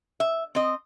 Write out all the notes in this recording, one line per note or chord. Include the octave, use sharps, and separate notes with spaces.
E5
C4 D#5